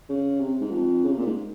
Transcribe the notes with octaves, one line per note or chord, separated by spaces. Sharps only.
C#3
C3
G#2
F2
C#3
C3
A#2
G#2